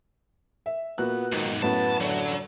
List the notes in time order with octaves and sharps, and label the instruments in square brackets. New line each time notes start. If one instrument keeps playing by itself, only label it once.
[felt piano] E5
[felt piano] A#2 F#4 F#6 [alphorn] B3
[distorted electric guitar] B1 G#2 [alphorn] D#3
[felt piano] F#2 A2 [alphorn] B3 [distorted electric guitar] A5
[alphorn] D3 [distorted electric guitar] F#3